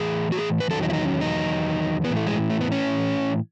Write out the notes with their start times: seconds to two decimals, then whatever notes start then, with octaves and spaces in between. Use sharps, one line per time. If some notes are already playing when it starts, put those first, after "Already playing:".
Already playing: A2 E3 G#4
0.32 F#4
0.38 G#4
0.60 B4
0.70 E2 D#3 F#3 A4
0.83 D#4
0.90 E4
0.93 D#4
1.05 C#4
1.21 D#4
2.04 E3 B3
2.10 A2
2.16 A3
2.27 G#3
2.50 A3
2.61 B3
2.72 C#4